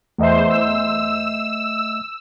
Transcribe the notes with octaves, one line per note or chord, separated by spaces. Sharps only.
E2 A3 C5 D#5 E5
E6